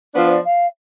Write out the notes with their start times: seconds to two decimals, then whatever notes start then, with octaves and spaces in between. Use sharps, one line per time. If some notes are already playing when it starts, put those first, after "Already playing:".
0.14 F3 B3 D4 F4 C5
0.29 D5
0.44 F5